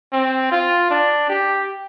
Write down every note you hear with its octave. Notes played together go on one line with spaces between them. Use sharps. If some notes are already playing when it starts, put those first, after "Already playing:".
C4
F4
D4
G4